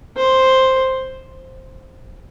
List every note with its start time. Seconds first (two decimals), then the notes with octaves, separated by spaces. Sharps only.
0.17 C5